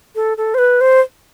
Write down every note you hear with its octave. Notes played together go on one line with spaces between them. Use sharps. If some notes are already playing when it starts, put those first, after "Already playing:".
A4
A4
C5
B4
C5